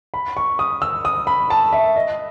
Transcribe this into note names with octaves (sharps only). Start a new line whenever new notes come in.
B5
C#6
D#6
E6
D#6
B5
A5
E5
D#5